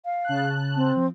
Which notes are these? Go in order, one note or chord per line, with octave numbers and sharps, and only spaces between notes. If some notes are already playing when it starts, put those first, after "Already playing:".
F5
C#3 A5 F#6
C4
F3